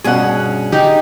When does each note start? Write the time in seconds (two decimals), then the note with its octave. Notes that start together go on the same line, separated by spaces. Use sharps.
0.04 G2 B2 C#4 G#4 F#5
0.72 D#4 G4